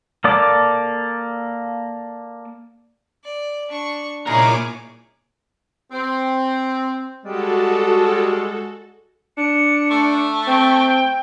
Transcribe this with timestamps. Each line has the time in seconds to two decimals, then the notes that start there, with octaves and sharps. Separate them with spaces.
0.24 A#3 A4 D5 D6
3.24 D5
3.69 D4 C#6
4.27 A#2 D#4 E4 G#4 A#4 C#5 D6
5.91 C4
7.25 G3 G#3 F#4 A4
9.37 D4 C#7
9.91 A3
10.47 C4 G5